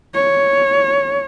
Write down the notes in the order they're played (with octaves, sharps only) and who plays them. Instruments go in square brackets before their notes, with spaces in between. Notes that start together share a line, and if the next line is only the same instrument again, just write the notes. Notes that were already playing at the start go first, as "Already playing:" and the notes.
[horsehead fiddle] C#5